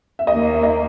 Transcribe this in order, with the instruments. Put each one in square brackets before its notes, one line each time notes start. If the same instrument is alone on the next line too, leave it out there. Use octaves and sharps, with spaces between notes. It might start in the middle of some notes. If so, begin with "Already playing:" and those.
[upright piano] E5
[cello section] D#2 D#3 A#3 [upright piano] D#5
[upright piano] E5
D#5